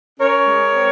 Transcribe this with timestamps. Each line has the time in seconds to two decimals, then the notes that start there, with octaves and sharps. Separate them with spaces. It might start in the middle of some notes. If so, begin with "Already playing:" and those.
0.20 C#4 A#4 C#5
0.47 G#3
0.75 C4